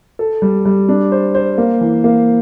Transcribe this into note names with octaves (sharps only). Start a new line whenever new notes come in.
A4
G3
G3
D4
C5
C5
A#3
E3
A#3